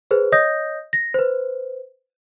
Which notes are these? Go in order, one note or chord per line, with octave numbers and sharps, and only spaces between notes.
G#4 B4 C5
C#5 D#5 D#6 G6 A#6
A#6
B4 C5